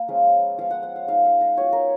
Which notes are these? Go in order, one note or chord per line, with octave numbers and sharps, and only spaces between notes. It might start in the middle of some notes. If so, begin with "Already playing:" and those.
Already playing: A#3
F3 G#3 C#4 F4
F3 B3 F4 F5
F#5
F#5
F5
G#3 D#4 F5
F5
D#5
F#3 B3 F4 C#5
A#4